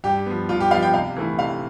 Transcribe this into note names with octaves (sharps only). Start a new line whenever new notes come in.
G2 G4
F3 B3
G2 F4
G4
F3 B3 F5
G5
C3 F5
E3 A3 E4
C3 F5